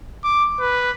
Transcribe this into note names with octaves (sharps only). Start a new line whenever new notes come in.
D6
B4